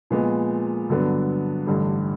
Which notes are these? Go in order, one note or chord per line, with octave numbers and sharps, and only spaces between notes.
A#2 F3 G#3 B3
G2 D3 F#3 B3 D4
A1 G2 D3 G3